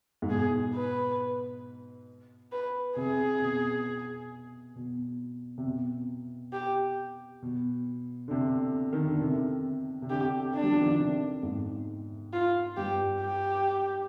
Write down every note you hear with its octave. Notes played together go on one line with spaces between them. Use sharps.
G#2
B2 G#4
B4
B4
C3 G#4
B2
B2
C3
B2
G4
B2
D3
C3
D#3
D3
C3
C3
D3 G4
D4
G3
F3
D#3
D3
C3
G#2
F4
G2 G4
G4